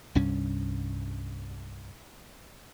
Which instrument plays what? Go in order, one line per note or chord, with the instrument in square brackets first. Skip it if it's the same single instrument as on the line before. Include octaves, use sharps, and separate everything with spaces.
[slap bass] C2 G2 C#4